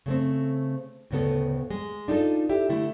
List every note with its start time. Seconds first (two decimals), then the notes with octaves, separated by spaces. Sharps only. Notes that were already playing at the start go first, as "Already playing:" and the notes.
0.06 C#3 A3 C4
1.11 D2 A2 C#3 B3 A4
1.70 G#3
2.08 D4 D#4 F4 A4
2.49 E4 G4 E5
2.69 D3 A3 E4